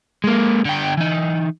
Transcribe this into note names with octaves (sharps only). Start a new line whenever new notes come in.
G#3 A#3
D3 G5
E3 D#4